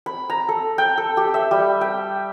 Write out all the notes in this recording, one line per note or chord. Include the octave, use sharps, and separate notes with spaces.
B5
A#5
A4
G5
A4
G4
E5
G3
G5